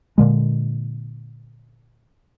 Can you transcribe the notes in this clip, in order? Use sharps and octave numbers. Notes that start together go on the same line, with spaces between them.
A#2 D3 G#3